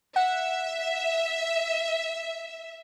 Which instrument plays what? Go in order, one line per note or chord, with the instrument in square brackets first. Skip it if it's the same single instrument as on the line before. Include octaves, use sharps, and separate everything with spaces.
[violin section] E5 [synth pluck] F#5